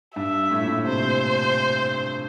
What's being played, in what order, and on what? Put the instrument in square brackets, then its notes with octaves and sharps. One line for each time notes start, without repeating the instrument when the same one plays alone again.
[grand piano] G2 [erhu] E5
[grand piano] A2
A#2
A2
[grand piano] C3 [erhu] C5